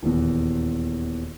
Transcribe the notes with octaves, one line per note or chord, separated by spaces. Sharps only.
D#1 E2